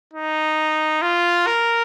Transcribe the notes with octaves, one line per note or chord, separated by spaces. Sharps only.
D#4
F4
A#4